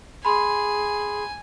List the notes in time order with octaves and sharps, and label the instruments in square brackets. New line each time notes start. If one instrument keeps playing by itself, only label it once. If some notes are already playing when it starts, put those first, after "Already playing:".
[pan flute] G#4 [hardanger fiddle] G#5 [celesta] B5 C6